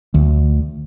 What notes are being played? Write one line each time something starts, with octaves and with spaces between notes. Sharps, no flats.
D2